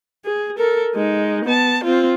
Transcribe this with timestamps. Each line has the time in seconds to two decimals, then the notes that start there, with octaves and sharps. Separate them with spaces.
0.25 G#4
0.58 A4 A#4
0.95 G#3 D#4
1.45 B3 A5
1.84 C4 F4